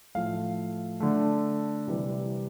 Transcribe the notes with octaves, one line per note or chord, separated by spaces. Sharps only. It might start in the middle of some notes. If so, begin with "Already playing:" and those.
A2 F3 A3 F5
D3 A3
C3 E3 G3